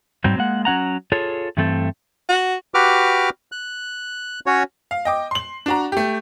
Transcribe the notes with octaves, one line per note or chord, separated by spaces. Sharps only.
G#2 F#3 G3 C4
G#3 A#3 F#5
F#3 C#4 F#5 A#5
F4 G#4 A4 C#5
G2 E3 A3 C4 A4
F#4
F#4 G4 B4 D6 F6
F#6
C#4 F#4 C#5
F5
D#5 G5 D6
C6 F#7
D4 F#4 A#5
A3 G4